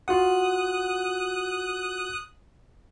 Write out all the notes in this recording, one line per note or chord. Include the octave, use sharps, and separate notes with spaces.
F4 F#4 F#5 D#6 F#6